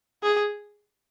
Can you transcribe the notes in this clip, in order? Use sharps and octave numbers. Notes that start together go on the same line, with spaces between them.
G#4